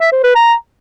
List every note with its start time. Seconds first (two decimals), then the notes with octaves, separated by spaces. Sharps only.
0.01 E5
0.12 C5
0.24 B4
0.35 A#5